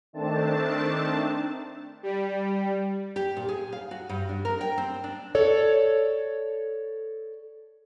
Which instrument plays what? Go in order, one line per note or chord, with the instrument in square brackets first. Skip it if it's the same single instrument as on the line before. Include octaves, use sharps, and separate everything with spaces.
[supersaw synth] D#3 A3 C4 D4 A5
G3
[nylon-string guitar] G4
A#2
G#4
F5
F#4
G2
D4
A#4
G5
C4
D4
[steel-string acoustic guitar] A4 C#5 D5